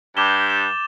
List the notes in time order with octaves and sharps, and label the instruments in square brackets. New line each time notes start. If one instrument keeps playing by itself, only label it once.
[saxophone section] G2 [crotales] D6 G6 E7 G7
[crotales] A6 E7 G7